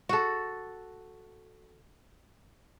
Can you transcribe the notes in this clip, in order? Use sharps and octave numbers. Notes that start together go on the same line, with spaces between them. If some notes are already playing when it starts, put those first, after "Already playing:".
F#4 A4